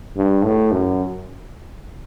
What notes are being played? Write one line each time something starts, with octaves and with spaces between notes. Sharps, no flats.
G2
A2
F#2